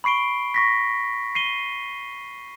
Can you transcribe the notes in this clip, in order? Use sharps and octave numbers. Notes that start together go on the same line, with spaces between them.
B5 C#6 C7 D7 G7
C#6 A#6 B6
C7 D#7 G7